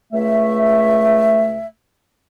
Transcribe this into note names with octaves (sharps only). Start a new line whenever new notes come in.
C#2 A3 E5